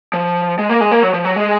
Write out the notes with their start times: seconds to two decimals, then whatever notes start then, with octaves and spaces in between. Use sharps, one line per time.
0.13 F3
0.59 G#3
0.69 A#3
0.81 G#3
0.92 A#3
1.03 F#3
1.13 F3
1.25 F#3
1.36 G#3